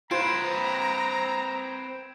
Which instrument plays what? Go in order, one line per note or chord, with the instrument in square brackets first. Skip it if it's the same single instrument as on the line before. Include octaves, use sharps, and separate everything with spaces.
[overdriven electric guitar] C4 B4 [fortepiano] F4 C5 [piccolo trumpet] A#5 [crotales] G#6 D7 E7